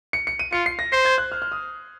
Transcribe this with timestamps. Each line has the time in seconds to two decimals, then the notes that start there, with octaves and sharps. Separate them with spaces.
0.13 C#7
0.27 C#7
0.39 D#7
0.53 F4 C#7
0.66 C7
0.79 A#6
0.92 C5 C7
1.05 G#6
1.18 F#6
1.32 F6
1.42 F6
1.52 D#6